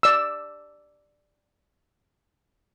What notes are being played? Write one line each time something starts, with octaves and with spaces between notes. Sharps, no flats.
D5 E6